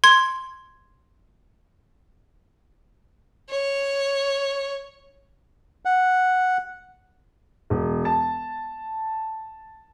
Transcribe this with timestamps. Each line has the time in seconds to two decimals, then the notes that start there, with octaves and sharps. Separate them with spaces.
0.04 C6 G#6
3.50 C#5
5.85 F#5
7.70 E1
8.05 A5